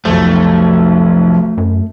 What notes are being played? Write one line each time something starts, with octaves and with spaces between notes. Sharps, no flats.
F1 B1 F2 F3 A3
F#2